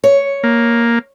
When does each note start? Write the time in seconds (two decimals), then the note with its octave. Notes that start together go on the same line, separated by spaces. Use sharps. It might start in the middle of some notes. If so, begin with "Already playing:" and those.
0.04 C#5
0.43 A#3